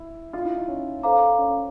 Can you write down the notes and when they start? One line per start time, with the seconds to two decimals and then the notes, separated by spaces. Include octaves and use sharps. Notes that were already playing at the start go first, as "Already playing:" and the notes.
Already playing: E4
0.33 F4
0.45 E4
0.57 D#4
0.68 C#4
1.03 A4 C5 F5 A#5 D6
1.38 C#4